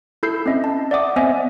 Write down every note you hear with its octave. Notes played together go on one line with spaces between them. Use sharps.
E4 A4 B5 E6 G6 C7
C4 C#4 D#5 E5
A5
D5 E5 F#5 D6 D#6
B3 C4 C5 D#5 E5 G#5